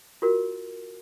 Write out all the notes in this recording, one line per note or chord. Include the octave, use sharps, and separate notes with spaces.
F4 F#4 A#4